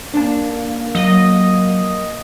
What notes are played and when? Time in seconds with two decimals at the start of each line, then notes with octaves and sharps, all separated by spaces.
0.14 A#3 D4 A5
0.95 F#3 D#5